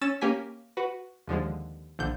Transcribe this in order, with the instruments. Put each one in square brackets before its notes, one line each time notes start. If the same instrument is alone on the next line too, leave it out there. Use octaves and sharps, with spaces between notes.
[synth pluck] C#4 E6 A6 E7
A#3 C#4 G4 G#5 B6
F#4 B4
D#2 D3 F3 G#3
A#1 D3 G6